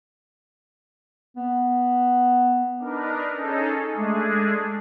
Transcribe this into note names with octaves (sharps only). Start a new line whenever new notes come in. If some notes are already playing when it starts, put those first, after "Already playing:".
B3
D4 D#4 A#4 B4
C#4 D#4 G#4 A4
G#3 A3 D4 G#4